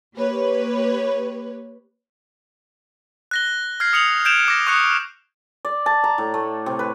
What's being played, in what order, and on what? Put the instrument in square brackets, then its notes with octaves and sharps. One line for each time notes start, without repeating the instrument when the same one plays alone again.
[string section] A#3 G4 B4 C#5
[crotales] F#6 A#6 G7
F6 G#6 C7
D#6 C#7 F7 F#7
G6 G#6 D7 E7 F7 G7
D6 A#6
C#6 D#6 F#6 C#7
[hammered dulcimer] D5
A5
A#5
A2
A3
C3
B4